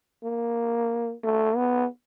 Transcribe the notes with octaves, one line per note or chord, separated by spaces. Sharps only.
A#3
A3
B3